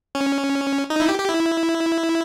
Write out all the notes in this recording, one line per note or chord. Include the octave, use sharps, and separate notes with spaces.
C#4
D#4
E4
G4
G4
E4